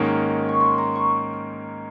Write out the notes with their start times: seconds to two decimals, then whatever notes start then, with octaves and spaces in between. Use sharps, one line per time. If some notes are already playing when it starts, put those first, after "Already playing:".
Already playing: G#2 D#3 A#3 C#4 A#5
0.49 C#6
0.60 C6
0.78 A#5
0.95 C#6